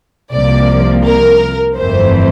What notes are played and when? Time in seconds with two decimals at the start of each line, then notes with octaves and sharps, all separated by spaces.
0.34 C2 C3 F3 A#3 D5
1.05 A#4
1.76 G1 F2 E3 A3 C4 C5